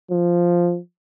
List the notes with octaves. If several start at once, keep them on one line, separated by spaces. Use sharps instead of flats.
F3